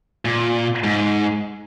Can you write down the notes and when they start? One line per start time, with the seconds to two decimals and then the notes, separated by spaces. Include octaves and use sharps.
0.25 A#2
0.84 G#2